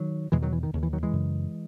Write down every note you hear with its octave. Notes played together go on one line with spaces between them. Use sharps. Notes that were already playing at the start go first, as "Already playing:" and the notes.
Already playing: D#3 F#3
E2 B2 E3 G#3
D#3 F#3
E3
D#3
D#2 C#3
E3
D#3 F#3
E3 G#3
F#2 C#3